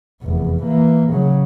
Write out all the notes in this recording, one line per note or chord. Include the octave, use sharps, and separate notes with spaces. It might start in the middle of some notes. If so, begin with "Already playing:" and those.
F1 E2
E3 A#3
C#3 F#3